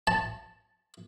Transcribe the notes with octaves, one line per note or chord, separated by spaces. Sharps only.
A5